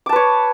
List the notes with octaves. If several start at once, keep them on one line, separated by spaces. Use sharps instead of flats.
B4 C#5 A5 D6